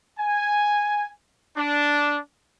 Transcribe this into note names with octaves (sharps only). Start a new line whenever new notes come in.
G#5
D4